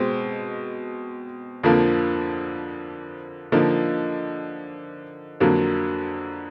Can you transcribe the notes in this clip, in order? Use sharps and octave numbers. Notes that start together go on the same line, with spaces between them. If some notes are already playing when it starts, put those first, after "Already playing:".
Already playing: B2 G#3 C4
F2 D3 F3 A#3
D3 F3 A#3 D#4
F2 D3 F#3 A#3